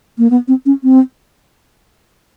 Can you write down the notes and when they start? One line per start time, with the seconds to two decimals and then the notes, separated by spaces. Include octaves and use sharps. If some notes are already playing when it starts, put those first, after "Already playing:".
0.18 A#3
0.30 B3
0.48 C4
0.66 C#4
0.83 C4